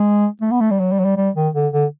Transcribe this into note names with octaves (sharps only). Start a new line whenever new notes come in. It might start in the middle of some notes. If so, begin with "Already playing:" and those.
Already playing: G#3
A3
B3
A3
G3
F#3
G3
F#3
G3
G3
D#3
D3
D3